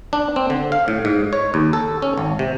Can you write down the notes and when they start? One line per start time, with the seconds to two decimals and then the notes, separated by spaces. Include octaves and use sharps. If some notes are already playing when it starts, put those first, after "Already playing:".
0.13 D4
0.36 C4
0.50 D3
0.72 F5
0.88 A2
1.05 G#2
1.33 C#5
1.54 D#2
1.73 A4
2.02 C#4
2.18 G#1
2.39 C3